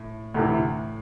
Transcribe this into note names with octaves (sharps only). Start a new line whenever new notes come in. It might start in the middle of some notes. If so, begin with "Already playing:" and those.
Already playing: A2
D2 A2 C3 E3